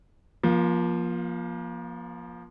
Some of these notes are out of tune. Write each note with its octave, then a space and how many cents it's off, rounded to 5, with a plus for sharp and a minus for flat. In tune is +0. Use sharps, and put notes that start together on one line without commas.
F3 +0 A#3 +35